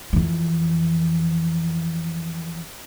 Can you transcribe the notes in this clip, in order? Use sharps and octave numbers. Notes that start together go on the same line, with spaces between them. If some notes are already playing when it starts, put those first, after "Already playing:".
F2 E3